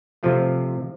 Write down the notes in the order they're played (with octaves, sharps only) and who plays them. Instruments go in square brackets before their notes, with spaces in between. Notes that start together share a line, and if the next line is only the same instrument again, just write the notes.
[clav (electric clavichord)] C3 F3 A3 F4